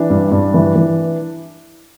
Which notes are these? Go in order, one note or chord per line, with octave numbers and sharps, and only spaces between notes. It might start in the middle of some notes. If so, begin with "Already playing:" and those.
Already playing: E3 D4
G2
G2
E3
E3